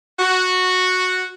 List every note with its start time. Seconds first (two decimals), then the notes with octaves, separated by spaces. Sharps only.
0.19 F#4